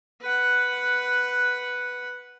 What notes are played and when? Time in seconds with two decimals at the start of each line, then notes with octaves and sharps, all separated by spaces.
0.21 B4 F#5